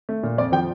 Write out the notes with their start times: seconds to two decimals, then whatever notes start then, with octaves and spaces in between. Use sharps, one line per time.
0.09 A3
0.23 A#2
0.38 F2 D5
0.52 F3 G5